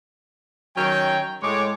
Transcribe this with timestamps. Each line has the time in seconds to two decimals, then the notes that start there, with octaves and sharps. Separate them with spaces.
0.76 D#3 F#3 C#4 G5
1.42 A2 G#3 C#5 D6